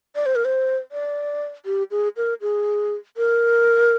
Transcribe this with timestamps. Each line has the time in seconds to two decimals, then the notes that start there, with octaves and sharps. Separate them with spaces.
0.15 D5
0.26 C5
0.35 A#4
0.45 C5
0.92 D5
1.66 G4
1.91 G#4
2.17 A#4
2.41 G#4
3.17 A#4